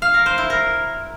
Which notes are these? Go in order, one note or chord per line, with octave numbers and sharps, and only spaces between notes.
F5
A#4
C5
E4
A#4